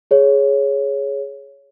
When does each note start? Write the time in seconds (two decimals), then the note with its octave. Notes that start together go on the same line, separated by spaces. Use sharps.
0.11 G#4 C#5